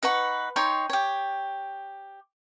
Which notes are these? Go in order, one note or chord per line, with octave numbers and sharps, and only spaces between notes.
D#4 B4 F#5 C#6
D#4 C#5 G5 C6
G4 C#5